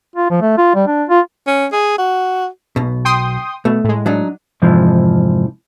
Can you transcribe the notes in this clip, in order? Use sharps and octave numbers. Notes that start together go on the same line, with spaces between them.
F4
F3
A3
F4
G3
D4
F4
C#4
G#4
F#4
B1 B2
G5 C6 D#6
B2 A3
A2 G#3
F#3 D4 D#4
F2 G#2 C3 E3 F3